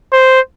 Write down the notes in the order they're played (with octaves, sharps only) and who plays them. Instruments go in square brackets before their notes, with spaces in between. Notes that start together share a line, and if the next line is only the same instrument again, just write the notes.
[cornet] C5